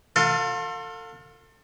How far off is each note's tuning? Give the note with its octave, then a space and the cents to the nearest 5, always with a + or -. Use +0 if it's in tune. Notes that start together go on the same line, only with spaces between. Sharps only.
F4 +35 A4 +35 F5 -20